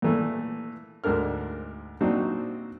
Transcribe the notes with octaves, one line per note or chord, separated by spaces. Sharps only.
A#2 E3 A3
D2 G#2 D4 A#4 F6
A#2 F#3 C4 D4 D#4 F#4